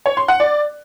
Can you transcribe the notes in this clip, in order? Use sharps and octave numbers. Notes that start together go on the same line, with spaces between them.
C#5
C6
F#5
D5